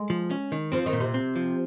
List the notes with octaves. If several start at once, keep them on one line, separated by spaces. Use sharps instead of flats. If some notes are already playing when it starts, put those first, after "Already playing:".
Already playing: G#3
F3
C#4
D#3
F3 C4
D#3
A#2
C3
C4
F3